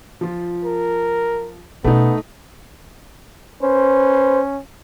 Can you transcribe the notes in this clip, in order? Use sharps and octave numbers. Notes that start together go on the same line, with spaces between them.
F3 F4
A#4
B2 A3 B3 C#4 D#4
C#4 B4 C5